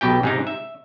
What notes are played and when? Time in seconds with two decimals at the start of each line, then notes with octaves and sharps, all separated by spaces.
0.01 B1 B2 G4 G5
0.23 G#2 C3 D#4
0.47 E5